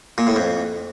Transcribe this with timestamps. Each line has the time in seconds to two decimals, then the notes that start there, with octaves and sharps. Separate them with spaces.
0.18 A#2
0.27 A2
0.36 F2